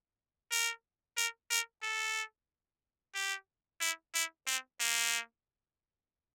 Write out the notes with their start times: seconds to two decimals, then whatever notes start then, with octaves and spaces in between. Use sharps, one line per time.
0.51 A#4
1.17 A#4
1.50 A#4
1.83 A4
3.15 G4
3.81 E4
4.14 E4
4.47 C4
4.80 A#3